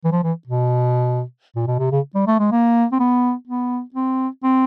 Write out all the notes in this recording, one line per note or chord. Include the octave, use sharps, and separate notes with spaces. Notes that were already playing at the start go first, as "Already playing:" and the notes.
E3
F3
E3
B2
A#2
B2
C3
C#3
G3
A3
G#3
A#3
C4
B3
B3
C4
C4